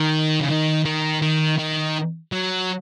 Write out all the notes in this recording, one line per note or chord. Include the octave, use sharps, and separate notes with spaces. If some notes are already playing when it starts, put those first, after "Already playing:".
Already playing: D#3
C#3
D#3
D#3
D#3
D#3
F#3